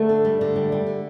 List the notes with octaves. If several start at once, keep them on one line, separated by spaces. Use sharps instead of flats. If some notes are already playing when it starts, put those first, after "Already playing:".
Already playing: D3 A3 A4
D4
G3
D3
G3
G3
D3